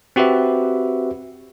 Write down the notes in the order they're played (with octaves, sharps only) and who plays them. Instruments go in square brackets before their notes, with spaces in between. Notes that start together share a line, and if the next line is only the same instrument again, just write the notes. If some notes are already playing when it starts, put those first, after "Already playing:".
[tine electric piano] C4 F#4 G4 B4 E5